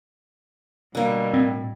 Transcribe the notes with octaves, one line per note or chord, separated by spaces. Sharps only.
B2 D3 G3 A#3
A2 C4